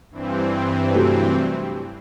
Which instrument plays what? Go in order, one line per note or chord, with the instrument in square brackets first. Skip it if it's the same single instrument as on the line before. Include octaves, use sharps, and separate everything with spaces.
[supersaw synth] G2 E3 C4
[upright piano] C3 F#3 A3